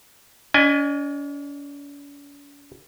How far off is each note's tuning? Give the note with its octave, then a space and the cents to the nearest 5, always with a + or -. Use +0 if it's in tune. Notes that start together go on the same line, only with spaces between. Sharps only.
C#4 +45 D#5 -30 G#5 +0